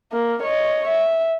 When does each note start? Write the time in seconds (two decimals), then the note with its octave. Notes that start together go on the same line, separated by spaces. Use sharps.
0.13 A#3
0.43 C#5 D#5
0.88 E5